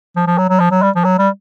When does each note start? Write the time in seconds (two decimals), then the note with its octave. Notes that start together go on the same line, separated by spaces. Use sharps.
0.16 F3
0.27 F3
0.38 F#3
0.49 F#3
0.60 F3
0.71 F#3
0.82 G3
0.95 F3
1.05 F#3
1.19 G3